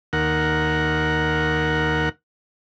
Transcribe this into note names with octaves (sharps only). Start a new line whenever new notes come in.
D#2 A#4 F#5